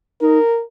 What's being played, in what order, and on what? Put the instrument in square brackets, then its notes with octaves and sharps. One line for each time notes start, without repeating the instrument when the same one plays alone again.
[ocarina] D#4 [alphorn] A#4